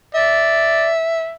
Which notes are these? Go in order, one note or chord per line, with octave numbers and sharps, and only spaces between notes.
D5 E5